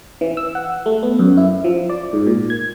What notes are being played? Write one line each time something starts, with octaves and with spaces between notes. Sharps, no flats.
E3
E6
F#5
A3
B3
F#2
E4
F3
D5
G#2
A#2
G#6